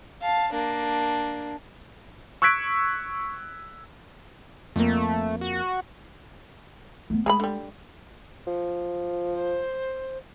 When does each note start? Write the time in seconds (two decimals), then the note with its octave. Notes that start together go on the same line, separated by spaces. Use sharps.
0.22 F5 A5
0.52 A#3 D4
2.42 C#6 E6 F#6 G#6 B6 D7
4.76 F2 A3 A#3
5.41 F#4
7.10 A3 B3
7.26 G#3 G#4 A#5 B5
7.40 D3 G3
8.47 F3
9.34 C5